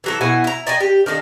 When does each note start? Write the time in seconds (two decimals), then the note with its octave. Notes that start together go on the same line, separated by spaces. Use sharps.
0.04 E3 F#3 A4
0.21 B2 E4 F#5 G#5
0.44 E4 A#5
0.67 D5 D#5 G5 G#5
0.80 G4
1.06 D#3 D4 D#4 A4